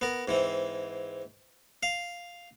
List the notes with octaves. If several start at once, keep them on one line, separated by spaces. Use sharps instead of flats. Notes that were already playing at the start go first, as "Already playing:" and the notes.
B3 A#4
G#2 E3 C4
F5